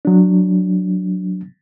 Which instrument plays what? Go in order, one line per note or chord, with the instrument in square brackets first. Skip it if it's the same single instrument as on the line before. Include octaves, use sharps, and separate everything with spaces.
[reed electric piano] F#3 D4